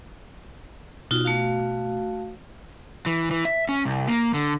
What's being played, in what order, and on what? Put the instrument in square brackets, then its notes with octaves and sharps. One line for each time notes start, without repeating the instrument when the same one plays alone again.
[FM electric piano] B2 [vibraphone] D#4 F4 F#4
[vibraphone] A3 F#4 F5
[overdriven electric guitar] E3
E3
E5
C#4
C2
A#3
D3